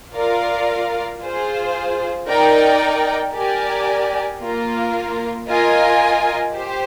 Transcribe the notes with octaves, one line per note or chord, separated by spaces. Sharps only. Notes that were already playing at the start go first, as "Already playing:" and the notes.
F4 A#4 D5 F5
F4 G#4 C5
D#4 A#4 D5 G5
G4 A#4 D5 G#5
A#3 F4 A#4
F4 A#4 D#5 G#5
G4 C5